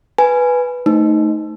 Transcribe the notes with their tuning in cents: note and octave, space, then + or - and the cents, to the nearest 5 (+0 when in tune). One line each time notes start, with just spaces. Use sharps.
B4 +0 G#5 +0
A3 +0 D#4 +0 C5 -15